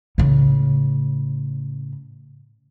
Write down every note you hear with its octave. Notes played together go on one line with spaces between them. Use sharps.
A2 C#3